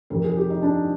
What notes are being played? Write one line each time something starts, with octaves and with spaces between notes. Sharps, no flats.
F2 C3 D#3 A#4
G#4
G4
D#4
D4